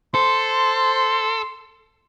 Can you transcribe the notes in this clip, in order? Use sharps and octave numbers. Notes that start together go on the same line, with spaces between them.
A4 C5 C6